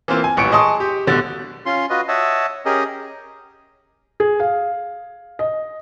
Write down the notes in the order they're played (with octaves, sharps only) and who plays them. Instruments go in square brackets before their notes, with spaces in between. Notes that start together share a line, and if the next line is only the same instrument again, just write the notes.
[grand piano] E3 A#3 C4 F4
G#5
D#1 A1 E3 C#6 C#7 D7
G#4 D#5 A5 C6 C#6 D#6
G4
D1 B2 D3 G3 A6
[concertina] C#4 F4 C6
F4 F#4 B4 D#5
C#5 D#5 E5 F#5 A5
C#4 G4 G#4 A#4 D#5
[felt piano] G#4
F5
D#5